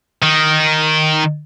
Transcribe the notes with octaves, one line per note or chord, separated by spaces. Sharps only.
D#3